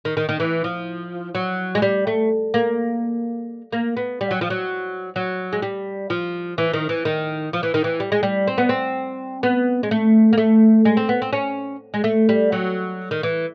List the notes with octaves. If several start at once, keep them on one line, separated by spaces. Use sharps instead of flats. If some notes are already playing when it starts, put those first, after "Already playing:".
D#3
D#3
D#3
E3
F3
F#3
G#3
G3
A3
A#3
A#3
B3
G3
F#3
F3
F#3
F#3
G#3
G3
F3
E3
D#3
E3
D#3
F3
E3
D#3
E3
G3
G#3
G3
C4
B3
C4
B3
G#3
A3
A#3
A3
G#3
C4
B3
C4
C#4
G#3
A3
G3
F#3
D#3
E3